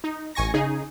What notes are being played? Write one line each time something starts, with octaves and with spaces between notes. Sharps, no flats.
D#4
A1 G#5 C#6 A#6
C#3 D#4 G#4